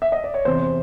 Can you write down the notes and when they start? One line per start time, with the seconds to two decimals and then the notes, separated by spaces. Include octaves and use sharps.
0.02 E5
0.12 D#5
0.24 D5
0.34 C#5
0.45 E2 C3 E3 C5